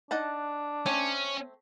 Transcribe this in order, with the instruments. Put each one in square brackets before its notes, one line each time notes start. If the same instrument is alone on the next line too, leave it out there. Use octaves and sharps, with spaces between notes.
[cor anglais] D4 [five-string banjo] D#4 F#5 A5
[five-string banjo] A3 C4 C#5 [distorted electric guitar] C#4